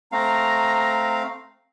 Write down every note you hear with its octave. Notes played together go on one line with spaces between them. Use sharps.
A3 C4 F5 A#5